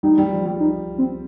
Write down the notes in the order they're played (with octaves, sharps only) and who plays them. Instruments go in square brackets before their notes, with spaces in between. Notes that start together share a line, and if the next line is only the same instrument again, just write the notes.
[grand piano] G3 [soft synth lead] D#4
[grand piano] G3
F3
G3
[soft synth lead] D#4
C4